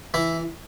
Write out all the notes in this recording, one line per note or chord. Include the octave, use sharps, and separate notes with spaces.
E3 E4